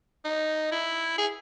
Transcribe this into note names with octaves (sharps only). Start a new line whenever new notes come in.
D#4
E4
G#4